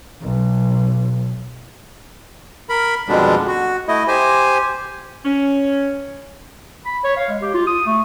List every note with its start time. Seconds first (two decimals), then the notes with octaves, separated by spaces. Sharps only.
0.21 B1
2.69 A#4 B5
3.08 F2 B2 D3 G3 G#3 D4
3.47 F#4
3.88 A3 E4 D#5
4.08 G4 C5 G#5
5.25 C#4
6.85 B5
7.04 C#5
7.17 F5
7.30 G#3
7.42 G4
7.54 F4
7.67 D#6
7.86 A3